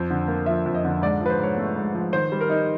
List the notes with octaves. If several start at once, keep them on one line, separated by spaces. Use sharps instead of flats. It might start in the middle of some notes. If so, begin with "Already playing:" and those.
Already playing: F2 C5
D3
A#3
F3 E5
F2
D#5
D3
G#2 D5
F3 B4
C5
G#2 C#5
A3
G#2
F3
D#3 C5
G3
A#4
D#4